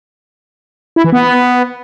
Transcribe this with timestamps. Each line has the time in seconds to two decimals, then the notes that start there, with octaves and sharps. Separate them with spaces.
0.96 E4
1.04 E3
1.12 B3